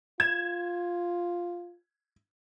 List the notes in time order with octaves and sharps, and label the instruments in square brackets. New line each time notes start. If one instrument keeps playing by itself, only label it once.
[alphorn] F4 [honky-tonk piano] G#6 E7